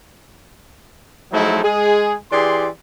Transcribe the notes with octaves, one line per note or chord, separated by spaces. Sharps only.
F3 F#3 G#3 A3 D#4 E4
G#3 G#4
E3 G4 G#4 D5 C6